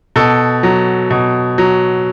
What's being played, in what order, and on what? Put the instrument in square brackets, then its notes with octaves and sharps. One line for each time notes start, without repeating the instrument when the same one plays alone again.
[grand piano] B2 A4
F#3
B2
F#3